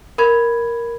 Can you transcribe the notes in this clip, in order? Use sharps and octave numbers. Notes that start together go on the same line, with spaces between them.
A#4 B5 G#6